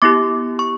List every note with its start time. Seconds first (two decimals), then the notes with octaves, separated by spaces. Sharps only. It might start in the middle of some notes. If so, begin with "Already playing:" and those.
0.02 B3 E4 G4 D6
0.59 C#6